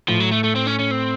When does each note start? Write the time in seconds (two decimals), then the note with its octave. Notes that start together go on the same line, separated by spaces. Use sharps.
0.08 A2 F3
0.20 F#3
0.31 A3
0.44 A3
0.56 C4
0.67 C#4
0.79 C#4
0.91 C4